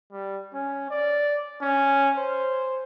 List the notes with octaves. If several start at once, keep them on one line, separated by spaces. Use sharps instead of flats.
G3
C#4
D5
C#4
C5